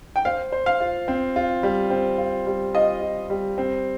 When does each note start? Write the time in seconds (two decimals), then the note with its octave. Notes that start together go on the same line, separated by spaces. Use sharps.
0.16 G5
0.25 C5 F5
0.52 C5
0.66 F5
0.80 F4
1.08 C4
1.36 F4
1.63 G3
1.90 C4
2.18 F4
2.46 G3
2.75 F4 D#5
3.02 F4
3.30 G3
3.58 C4